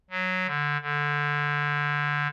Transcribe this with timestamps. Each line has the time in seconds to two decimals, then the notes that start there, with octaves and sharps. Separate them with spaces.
0.10 F#3
0.46 D3
0.81 D3